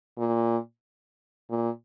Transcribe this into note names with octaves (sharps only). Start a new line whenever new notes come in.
A#2
A#2